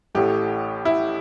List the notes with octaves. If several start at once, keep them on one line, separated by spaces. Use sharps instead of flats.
A1 A2 A3 G4
E4